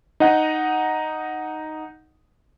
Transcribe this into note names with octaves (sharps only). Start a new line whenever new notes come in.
D#4 D#5 F#5